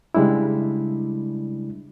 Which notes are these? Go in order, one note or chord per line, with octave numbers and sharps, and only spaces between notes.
C#3 G3 G#3 D4 E4